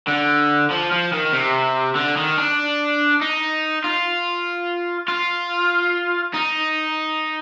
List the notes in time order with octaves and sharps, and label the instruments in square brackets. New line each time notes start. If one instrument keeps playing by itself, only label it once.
[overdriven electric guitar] D3
F3
F3
D#3
C3
D3
D#3
D4
D#4
F4
F4
D#4